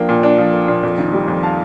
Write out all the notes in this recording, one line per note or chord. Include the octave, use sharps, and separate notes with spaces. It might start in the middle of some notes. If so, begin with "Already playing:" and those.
Already playing: F3 A#3 D4 G5
A#2
D4
F3
A#3
A#2
F2
D#3
G3
F2
F5 A5